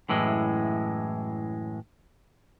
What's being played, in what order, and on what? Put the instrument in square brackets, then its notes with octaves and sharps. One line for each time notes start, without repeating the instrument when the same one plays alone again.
[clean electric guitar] F#2 A2 E3 G#3